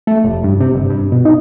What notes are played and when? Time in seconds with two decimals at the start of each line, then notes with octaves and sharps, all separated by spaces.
0.07 A3
0.24 F1
0.44 G2
0.60 C3
0.74 G1
0.90 G2
1.12 B2
1.25 D#4